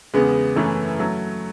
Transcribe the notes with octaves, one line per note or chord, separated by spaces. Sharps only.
E2 C#3 G#3 B3
F#2 E3 A3 C#4 E4
F#3 A3